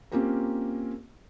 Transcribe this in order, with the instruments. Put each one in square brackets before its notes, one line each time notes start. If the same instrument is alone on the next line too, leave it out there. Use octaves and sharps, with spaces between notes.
[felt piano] A#3 C4 C#4 F4 G4 A#4